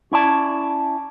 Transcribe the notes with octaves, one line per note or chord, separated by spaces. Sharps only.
C#4 E4 D5 A5